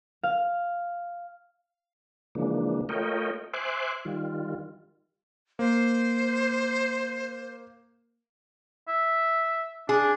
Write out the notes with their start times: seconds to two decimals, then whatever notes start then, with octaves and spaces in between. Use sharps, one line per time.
0.23 F5
2.35 C#3 E3 F3 G#3 A#3 D4
2.89 A3 F4 A#4 C#5 D#5 G5
3.53 C5 E5 G#5 C6 D6 F#6
4.05 D#3 G3 F4
5.59 A#3 C5
8.88 E5
9.89 D4 G#4